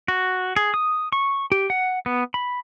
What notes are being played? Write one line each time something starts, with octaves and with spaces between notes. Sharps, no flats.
F#4
G#4
D#6
C#6
G4
F#5
B3
B5